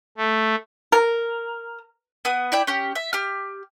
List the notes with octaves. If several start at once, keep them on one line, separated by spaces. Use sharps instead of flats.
A3
A#4
B3 D#6
E4 D5 G5
C#4 G4
E5
G4 F6